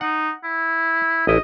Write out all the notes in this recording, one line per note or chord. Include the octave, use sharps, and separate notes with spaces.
D#4 F#5
E4
A1 E4 D#5